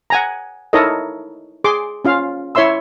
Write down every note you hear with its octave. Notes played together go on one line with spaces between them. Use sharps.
F#5 G#5 A#5
D#4 E4 A4 A#4 C#5 D#5
G#4 C6 D6
C#4 F4 F5
E4 C#5 E5 C6 E6